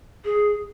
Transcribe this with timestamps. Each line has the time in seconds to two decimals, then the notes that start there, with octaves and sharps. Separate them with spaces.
0.25 G#4